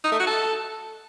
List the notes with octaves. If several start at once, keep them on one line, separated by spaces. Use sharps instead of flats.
D#4
A3
F#4
A4